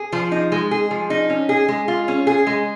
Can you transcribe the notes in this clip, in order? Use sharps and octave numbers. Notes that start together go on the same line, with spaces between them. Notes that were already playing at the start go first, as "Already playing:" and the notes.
Already playing: G#4
F3
D#4
G#3
G#4
F3
D#4
C#4
G#4
G#3
F4
C#4
G#4
G#3